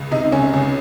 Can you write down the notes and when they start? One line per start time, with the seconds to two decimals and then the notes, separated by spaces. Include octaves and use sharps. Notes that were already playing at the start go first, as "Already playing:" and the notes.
Already playing: C#2
0.11 C3 D#4
0.32 C#2 C#4
0.53 C#2